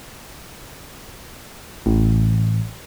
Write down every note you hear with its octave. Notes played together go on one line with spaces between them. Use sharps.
A1